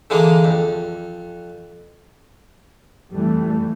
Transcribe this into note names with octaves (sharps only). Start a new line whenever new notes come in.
D3 E3 G#3 A#3 D4
F2
F2 E3 G3 A3